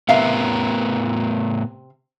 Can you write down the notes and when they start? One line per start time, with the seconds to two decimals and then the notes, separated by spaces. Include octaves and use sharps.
0.09 A2 C3 B3 A#4 E5 F5